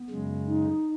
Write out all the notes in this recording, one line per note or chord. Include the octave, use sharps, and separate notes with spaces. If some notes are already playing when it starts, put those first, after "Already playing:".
Already playing: B3
F#2 C#3 G#3
D#4